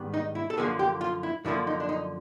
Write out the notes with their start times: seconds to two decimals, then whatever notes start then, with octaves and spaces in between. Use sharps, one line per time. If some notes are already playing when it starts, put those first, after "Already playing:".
Already playing: G#2 D#3 G3 B3
0.14 D#4
0.35 E4
0.50 A4
0.57 F#2 D3 F3 A#3 G#4
0.79 G4
1.01 F4
1.23 E4
1.45 F#2 D3 F3 A#3 E4
1.67 D#4
1.80 D4
1.89 D#4